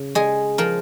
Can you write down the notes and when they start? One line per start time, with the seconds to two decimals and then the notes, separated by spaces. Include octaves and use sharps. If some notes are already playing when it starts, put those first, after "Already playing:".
Already playing: C#3
0.15 G#3 G#4
0.58 F3 A#4